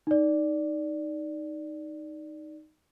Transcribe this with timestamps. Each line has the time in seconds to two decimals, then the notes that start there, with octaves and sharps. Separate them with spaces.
0.07 D#4 D5